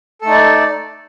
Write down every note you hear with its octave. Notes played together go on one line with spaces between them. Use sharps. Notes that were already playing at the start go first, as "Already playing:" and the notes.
A3 D#4 A4 D5